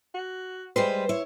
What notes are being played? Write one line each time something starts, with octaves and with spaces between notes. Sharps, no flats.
F#4
G3 G#3 B4 C5
E4 C#5